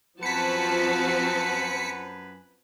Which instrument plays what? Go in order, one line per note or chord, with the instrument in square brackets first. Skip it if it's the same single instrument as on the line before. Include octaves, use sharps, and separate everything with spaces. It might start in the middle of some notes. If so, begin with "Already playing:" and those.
[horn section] F#2 B4 [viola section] F3 [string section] C4 F#4 A5 [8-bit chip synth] B6 C#7